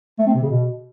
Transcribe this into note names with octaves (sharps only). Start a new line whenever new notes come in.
A3
C4
C3
C#3
B2